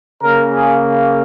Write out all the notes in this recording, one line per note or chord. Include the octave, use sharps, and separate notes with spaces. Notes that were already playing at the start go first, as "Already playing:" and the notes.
C#3 A#3 A#4
G#4